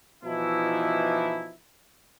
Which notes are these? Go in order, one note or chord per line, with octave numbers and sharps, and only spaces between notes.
B2 E3 F3 D#4 E4